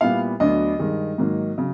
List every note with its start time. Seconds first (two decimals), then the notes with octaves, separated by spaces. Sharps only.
0.01 A#2 G3 B3 E4 F5
0.40 D2 D3 F#3 B3 D4 D#5
0.79 G2 D#3 G#3
1.18 G#2 D#3 F#3 A#3
1.58 C#3 F#3